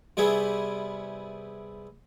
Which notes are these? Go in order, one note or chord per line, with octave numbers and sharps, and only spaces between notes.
C3 G3 B3 E4 G#4